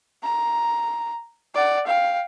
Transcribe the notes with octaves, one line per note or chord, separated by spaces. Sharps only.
A#5
D5 F#5
F5 G5